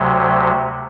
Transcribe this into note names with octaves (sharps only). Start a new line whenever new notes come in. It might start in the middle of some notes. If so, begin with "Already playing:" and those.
Already playing: D2 C3 F#3